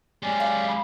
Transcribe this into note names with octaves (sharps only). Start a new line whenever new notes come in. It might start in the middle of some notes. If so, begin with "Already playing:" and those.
G#3 C#4 G4 D5
F5
B5